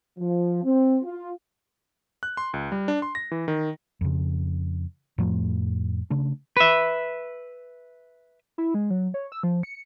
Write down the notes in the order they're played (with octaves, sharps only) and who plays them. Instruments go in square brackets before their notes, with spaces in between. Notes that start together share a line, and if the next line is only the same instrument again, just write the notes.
[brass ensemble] F3
C4
F4
[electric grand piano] F#6
C6
C#2
G3
D4
C6
A#6
E3
D#3
[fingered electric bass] F2 C#3
F2 A2 F3 A3
C#3 A3 D4
[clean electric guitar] B4 E5
[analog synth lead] E4
G#3
F#3
C#5
E6
F3
C#7